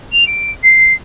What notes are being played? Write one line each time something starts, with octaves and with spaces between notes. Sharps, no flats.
F7
D7
C7